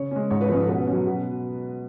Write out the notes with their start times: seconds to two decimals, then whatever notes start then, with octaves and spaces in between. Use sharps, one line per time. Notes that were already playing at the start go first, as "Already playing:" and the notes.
Already playing: C#3 C#5
0.11 G#3 C#4
0.30 G#2 C#5
0.41 B4
0.49 F3 G#3 C#4 C#5
0.61 A4
0.68 B2 B4
0.87 F#3 C#4
1.06 B2